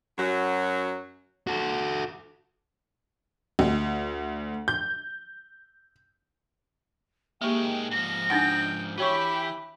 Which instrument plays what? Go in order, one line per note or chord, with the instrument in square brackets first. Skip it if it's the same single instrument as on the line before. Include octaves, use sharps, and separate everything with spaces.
[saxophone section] F#2 F#3 F#4
[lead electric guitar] F#4 A4
[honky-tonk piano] D2
G6
[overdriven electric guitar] D#3 G#3 [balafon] A#3 G4 [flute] G5
[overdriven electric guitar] G#2 F3 [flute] A#6
[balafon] D4 D#4 F#5 [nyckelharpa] G5 D#6
[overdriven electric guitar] E3 [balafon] F#4 C#5 C#6 [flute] G4 [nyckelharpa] E5 B5